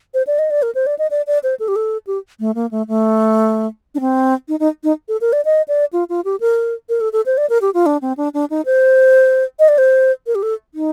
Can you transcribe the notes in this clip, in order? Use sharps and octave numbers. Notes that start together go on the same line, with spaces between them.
C5
D5
D#5
D5
A#4
C5
D5
D#5
D5
D5
C5
A4
G4
A4
G4
A3
A#3
A3
A3
D4
C4
D#4
D#4
D#4
A4
A#4
D5
D#5
D5
F4
F4
G4
A#4
A#4
A4
A4
C5
D5
A#4
G4
F4
D4
C4
D4
D4
D#4
C5
D#5
D5
C5
A#4
G4
A4
D#4